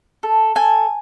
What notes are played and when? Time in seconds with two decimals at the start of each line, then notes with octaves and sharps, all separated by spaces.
0.23 A4
0.55 A4 G#5